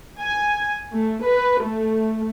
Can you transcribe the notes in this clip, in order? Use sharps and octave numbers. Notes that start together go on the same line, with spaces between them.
G#5
A3
B4
A3